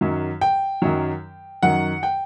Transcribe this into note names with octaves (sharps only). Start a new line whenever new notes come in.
F#2 D#3 F#3
G5
F#2 D#3 F#3
F#2 D#3 F#3 F#5
G5